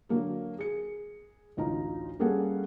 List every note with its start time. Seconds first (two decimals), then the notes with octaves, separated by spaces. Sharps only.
0.09 D3 F#3 A#3 A#4
0.59 G#4 C#7
1.57 A1 D2 D#4 F4 A#5
2.19 G3 A#3 C#4 G#4 A4 F#5